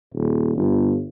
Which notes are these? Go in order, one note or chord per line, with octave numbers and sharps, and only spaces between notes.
D#1
G1